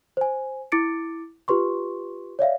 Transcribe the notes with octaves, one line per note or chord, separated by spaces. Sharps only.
C5 G#5
E4 D6 A6 C#7 D7
F4 G4 B4 C6 C#6
C#5 D5 E5 F5